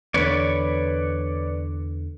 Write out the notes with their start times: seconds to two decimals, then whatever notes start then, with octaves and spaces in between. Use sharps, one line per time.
0.14 E2 D3 B4 C#5 D5